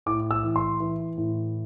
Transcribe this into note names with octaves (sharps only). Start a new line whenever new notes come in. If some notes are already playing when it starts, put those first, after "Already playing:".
A2 D6
E6
E3
C6
E3
A2